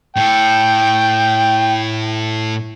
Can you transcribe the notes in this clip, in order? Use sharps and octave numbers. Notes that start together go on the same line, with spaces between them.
A2 A4 G5